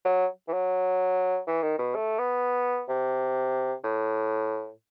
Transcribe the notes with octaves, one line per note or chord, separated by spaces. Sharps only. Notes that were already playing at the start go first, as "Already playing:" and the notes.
F#3
E3
F#3
E3
D#3
B2
A3
B3
C3
A2